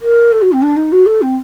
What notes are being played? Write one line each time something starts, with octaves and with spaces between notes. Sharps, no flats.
A#4
A4
F#4
C4
D4
D#4
F#4
A4
C4